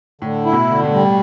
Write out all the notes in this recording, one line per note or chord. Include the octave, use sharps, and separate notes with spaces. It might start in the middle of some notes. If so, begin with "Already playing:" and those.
A2 D3
E4
B2
D3
A2
G3